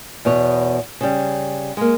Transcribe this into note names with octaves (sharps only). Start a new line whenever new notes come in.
E2 B2 C#5
C#3 G3
G#3 A#3